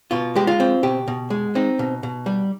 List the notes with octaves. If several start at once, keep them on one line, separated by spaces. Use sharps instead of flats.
B2 F4
G#3 G4
F4
C4
B2 G4
B2
G#3
C4 D#4
B2
B2
G3